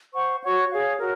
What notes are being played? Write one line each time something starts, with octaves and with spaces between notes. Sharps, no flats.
C5 F#5 C#6
F#4 C#5 F#5 C#6
G#4 C#5 F5
F#4 A#4 C#5